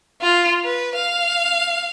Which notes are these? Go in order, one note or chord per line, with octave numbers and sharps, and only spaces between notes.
F4
B4
F5